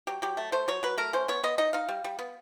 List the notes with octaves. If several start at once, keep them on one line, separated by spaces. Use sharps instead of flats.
F#3 G4
F#3 G4
A3
A3 C5
F#3 C#5
F#3 B4
A3 A#4
C#4 C5
B3 C#5
B3 D#5
D#4 D#5
D#4 F5
G3
G3
B3